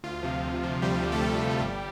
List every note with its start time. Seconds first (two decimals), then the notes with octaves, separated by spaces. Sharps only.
0.04 D2 F4
0.23 C3 F3
0.44 D2
0.63 C3 F3
0.82 D2 G3 G4
1.03 C3 F3
1.12 A3 A4
1.21 D2 G3 G4
1.42 C3 F3
1.61 G1